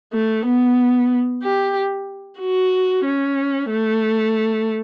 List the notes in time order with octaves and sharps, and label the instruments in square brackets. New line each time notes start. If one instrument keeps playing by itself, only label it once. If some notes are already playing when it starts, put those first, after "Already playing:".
[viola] A3
B3
G4
F#4
C#4
A3